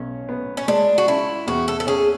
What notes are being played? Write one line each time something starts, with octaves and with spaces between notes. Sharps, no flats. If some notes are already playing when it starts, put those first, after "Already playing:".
Already playing: B1 C#4
B3
C#4
G#3 D4
F#4
C#3 E4
E2 F#4
A4
A4
C#4 G#4